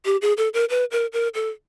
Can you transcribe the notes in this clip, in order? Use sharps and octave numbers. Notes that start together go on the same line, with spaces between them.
G4
G#4
A4
A#4
B4
A#4
A#4
A4